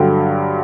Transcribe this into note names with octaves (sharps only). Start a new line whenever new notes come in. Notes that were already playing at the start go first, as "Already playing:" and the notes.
Already playing: G2 D3 F#3 G5